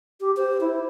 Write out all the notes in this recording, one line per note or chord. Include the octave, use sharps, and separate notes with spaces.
G4
C5
E4